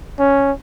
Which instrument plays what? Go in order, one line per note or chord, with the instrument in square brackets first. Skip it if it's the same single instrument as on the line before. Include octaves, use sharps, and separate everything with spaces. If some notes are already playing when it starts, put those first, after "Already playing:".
[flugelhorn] C#4